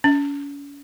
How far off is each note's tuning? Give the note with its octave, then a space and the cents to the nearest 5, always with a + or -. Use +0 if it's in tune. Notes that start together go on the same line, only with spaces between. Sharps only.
C#4 +40